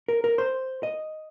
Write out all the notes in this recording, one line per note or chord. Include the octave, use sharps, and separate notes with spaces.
A#4
A#4
C5
D#5